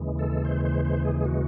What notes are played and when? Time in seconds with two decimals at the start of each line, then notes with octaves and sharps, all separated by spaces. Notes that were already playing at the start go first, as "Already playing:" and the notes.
Already playing: D#2 C#3 E3 G#3
0.19 A4
0.45 C5
0.65 C5
0.85 C5
1.05 G#4
1.21 G#4
1.25 F#4